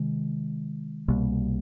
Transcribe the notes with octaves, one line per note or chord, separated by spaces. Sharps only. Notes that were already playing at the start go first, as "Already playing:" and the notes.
Already playing: C3 D#3 G#3
C2 B2 G3 A#3